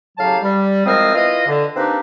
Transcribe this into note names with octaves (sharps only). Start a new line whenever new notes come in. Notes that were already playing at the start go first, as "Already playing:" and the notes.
A2 C#3 F#3 G4 F5 A5
G3
E2 F3 G#3 C4 A#4 D#6
E4 F4 B4 D#5
D3
A#3 C4 D4 D#4 G4 B4